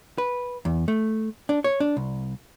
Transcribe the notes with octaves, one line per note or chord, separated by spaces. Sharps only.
B4
E2
A3
D4
C#5
D4
C2